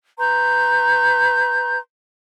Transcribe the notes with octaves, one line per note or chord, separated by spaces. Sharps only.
B4 A#5 C6 G6